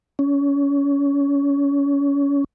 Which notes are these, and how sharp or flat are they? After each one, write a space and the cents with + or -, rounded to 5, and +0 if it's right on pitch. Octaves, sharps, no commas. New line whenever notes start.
C#4 +25